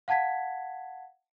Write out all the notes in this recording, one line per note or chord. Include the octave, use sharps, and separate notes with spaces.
F5 F#5 A5 G#6 B6